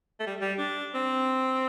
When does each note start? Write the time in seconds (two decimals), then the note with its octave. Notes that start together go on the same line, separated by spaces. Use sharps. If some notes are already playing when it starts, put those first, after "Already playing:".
0.20 A3
0.27 G3
0.41 G3
0.58 D4
0.95 C4